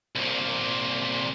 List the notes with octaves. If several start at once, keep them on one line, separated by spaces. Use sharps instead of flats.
C2 A#2